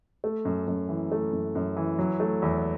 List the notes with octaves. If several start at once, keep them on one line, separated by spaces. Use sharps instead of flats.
A3
F#2
F#2
E3
A3
F#2
F#2
E3
F#3
A3
E2